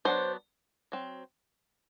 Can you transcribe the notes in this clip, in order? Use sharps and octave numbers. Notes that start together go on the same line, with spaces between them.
F#3 B3 D4 C5
F#3 C4